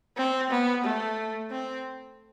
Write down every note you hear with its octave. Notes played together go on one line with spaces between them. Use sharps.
C4
B3
A3
C4